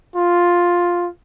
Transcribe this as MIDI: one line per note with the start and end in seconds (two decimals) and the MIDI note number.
0.16 1.08 65